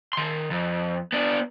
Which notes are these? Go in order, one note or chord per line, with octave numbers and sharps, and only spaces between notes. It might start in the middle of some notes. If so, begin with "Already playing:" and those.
D#3 C6
F2
B3 D4